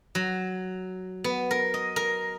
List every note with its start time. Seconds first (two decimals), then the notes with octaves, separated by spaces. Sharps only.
0.15 F#3
1.24 B3
1.51 A#4
1.74 D#5
1.96 A#4